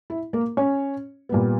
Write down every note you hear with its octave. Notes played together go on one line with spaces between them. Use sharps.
E4
A#3 A#4
C#4 C#5
A#2 G3 B3